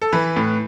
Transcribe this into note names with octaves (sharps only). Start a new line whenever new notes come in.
A4
E3 B4
A2